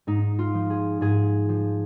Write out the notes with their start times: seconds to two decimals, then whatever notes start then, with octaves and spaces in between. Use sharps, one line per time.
0.07 G#2 D#4
0.39 F4
0.54 F3
0.70 G#4
1.01 G#2 G#4
1.49 F3